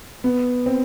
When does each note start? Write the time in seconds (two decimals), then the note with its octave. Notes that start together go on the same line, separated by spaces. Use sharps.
0.24 B3
0.66 C4